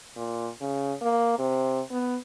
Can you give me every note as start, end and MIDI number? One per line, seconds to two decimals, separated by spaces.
0.16 0.50 46
0.61 0.93 49
1.01 1.36 58
1.38 1.81 48
1.91 2.16 59